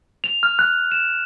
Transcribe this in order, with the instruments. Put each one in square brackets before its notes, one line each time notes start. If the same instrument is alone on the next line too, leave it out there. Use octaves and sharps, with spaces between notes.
[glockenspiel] F7
F6
F#6
E7